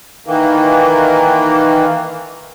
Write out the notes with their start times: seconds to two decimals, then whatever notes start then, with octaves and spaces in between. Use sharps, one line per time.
0.26 D#3 E3 A#3